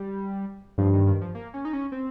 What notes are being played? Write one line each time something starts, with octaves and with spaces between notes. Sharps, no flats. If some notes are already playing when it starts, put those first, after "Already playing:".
Already playing: G3
G2 F3
D#3
D#3
F3
A#3
C#4
D#4
C#4
C4